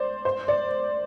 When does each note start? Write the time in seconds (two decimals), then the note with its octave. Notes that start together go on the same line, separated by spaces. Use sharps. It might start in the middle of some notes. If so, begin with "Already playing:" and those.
Already playing: C5 D5
0.25 C5
0.48 D5